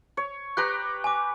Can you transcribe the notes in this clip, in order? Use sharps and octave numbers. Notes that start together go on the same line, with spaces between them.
C#5
G4 B4 A#5 F#6
G#5 D6